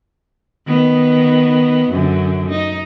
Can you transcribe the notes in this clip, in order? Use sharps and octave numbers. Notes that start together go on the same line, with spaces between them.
D#3 B3
F#2 D3
D#4